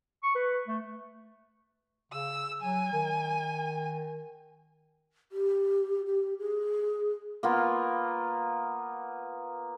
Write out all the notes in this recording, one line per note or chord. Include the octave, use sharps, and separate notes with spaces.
C#6
B4
A3
C#3 E6
F#3 G#5
D#3
G4
G4
G#4
A#3 B3 F4